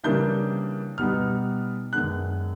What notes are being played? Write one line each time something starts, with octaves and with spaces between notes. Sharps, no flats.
C#3 E3 G3 A#3 D4 G6
B2 G3 B3 D#4 F6
F#2 D#3 G#3 B3 D4 F#6